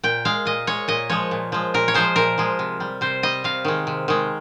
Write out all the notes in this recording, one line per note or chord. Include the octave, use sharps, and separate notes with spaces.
A#2 G5
G#3 F5
A#2 D#5
G#3 C#5
A#2 D#5
F3 G#3 C#5
A#2
F3 G#3
A#2 A#4
C#5
F3 G#3 C5
A#2 A#4
F3 G#3
C3
G3
C3 C5
G3 D#5
C3 F5
D#3 G#3
C3
D#3 G#3